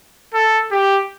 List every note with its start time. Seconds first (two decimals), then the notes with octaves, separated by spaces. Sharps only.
0.34 A4
0.72 G4